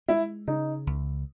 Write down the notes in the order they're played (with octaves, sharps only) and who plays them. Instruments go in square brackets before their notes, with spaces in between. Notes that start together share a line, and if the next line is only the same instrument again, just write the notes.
[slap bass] G#3 [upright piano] E4
[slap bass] C#3 [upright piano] D#4
[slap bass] C#2